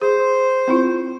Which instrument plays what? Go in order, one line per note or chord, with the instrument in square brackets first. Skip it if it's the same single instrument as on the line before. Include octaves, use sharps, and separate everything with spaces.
[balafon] G#4 [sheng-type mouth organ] C5
[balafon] C4 E4 F4